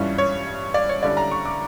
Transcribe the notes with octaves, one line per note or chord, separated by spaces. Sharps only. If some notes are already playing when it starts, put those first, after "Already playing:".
Already playing: G2 E3 G3 C#4 F4 C#5
C#5
D5
C#5
D3 G3 C#4 E4 D5
A#5
C#6
D6